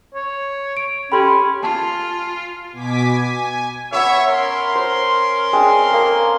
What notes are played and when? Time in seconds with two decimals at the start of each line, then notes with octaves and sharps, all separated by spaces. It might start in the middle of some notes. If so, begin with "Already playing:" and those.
0.14 C#5
0.77 D7
1.12 C#4 G4 A4 G5 B5 C6 G#6
1.62 F4 G#5 A5
2.73 B2 G#5 D6 B6
3.05 G#5
3.92 B3 C#5 E5 C#6 D6
4.28 C#4 A#4 C6
4.75 C5
5.53 G#3 C4 D4
5.91 A#3 A4